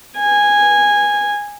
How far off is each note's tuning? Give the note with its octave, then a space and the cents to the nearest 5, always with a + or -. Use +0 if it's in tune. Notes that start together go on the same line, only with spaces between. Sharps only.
G#5 -10